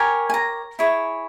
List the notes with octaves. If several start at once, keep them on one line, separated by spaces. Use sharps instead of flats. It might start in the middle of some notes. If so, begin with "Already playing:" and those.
Already playing: G4 A#4 C#5 G#5
G#5
A#5
E4 G#4 C#5